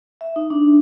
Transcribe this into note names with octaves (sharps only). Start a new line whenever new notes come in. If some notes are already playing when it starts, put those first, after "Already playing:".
E5
D#4
D4